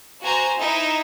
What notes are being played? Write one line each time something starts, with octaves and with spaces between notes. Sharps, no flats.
F#4 C5 G#5 A#5
D#4 E4 E5